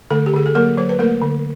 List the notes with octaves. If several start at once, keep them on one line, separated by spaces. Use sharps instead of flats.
D3 A3 A4
G4
D3 G#4
A4
F#3 A#3 A#4
F#3 C5
B4
A3 A#3 A#4
D3